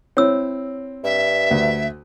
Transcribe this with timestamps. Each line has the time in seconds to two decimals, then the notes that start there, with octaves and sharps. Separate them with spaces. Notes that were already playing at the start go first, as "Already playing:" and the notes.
0.17 C4 E4 C#5 E6
1.04 G2 E5
1.51 D2